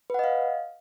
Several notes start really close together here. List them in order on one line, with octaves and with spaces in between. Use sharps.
B4 F#5 D#5 F5